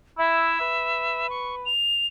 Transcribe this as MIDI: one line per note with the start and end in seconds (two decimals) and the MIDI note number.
0.18 0.58 64
0.18 1.30 76
0.60 1.69 71
1.30 1.55 85
1.66 2.07 101